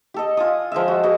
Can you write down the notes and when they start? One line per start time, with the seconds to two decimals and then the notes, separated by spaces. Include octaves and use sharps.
0.14 G4 A4 D#5
0.37 F4 G#5 D#6
0.72 F3 G#3 D#5 E5
0.88 F#4
1.03 F#4 G#4 B4 D#5